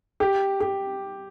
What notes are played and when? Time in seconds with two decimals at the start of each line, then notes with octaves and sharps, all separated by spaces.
0.20 G4
0.60 G4